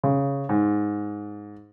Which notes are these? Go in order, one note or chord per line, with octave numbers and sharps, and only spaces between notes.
C#3
G#2